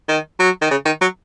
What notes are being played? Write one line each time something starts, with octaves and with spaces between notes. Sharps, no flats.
D#3
F#3
D#3
C#3
D#3
F#3